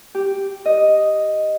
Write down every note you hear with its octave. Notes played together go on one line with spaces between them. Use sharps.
G4
D#5